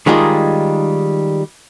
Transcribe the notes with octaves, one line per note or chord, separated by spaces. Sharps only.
D#3 G3 G#3 D#4 F4 G#4